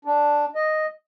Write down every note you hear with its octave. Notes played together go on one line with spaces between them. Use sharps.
D4
D#5